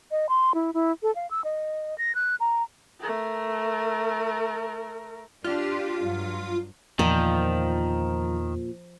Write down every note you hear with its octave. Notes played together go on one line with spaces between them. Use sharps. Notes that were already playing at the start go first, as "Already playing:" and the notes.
D#5
C6
E4
E4
A4
F5
E6
D#5
A#6
F#6
A#5
A3 A#4
D4 F4 G4
G2 F#3
E2 A#2 D#3 F3